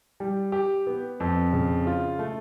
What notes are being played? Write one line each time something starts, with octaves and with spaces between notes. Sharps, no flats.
G3
G4
B3
F2
C#3
F4
A3